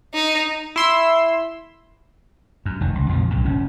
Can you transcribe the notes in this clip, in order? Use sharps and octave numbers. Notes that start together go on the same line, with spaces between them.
D#4
E4 C6 E6
F#2
F1 D#3
C#2
A#1 F2 B2 F3
C2 F#2 A#2
F#1 A2 C#4